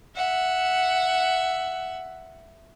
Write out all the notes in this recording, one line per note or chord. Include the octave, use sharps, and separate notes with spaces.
E5 F#5